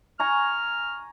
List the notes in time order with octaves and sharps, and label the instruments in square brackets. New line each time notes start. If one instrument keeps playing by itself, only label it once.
[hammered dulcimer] G#5 A#5 C#6 [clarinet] F6